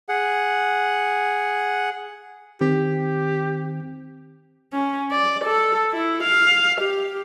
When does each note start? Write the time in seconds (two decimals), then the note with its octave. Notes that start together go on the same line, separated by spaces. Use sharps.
0.09 G#4 F#5
2.61 D#3 C4 G4
4.73 C#4
5.11 D5
5.44 A4
5.92 E4
6.23 F5
6.81 G4